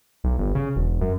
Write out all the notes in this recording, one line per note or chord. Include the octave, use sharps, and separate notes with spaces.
B1
G1
C#3
E1
F#2